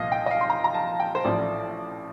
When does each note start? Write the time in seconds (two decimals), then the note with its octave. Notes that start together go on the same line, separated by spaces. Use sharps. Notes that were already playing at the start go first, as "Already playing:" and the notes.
Already playing: C2 A#2 F3 D#5 F5
0.12 G5
0.26 D#5
0.31 F5
0.41 C6
0.50 A#5
0.64 A#5
0.74 A5
1.00 G5
1.15 C5
1.24 A1 A2 F3 D5